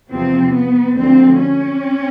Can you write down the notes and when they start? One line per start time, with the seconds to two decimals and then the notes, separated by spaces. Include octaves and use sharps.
0.10 E2 C3 F3 C4
0.53 B3
0.95 D2 D3 F3 C4
1.38 C#4